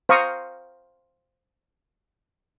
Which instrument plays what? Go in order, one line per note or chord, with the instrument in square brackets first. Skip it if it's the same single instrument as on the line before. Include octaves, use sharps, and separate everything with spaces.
[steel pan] C5 F5 A#5 C#6 D#6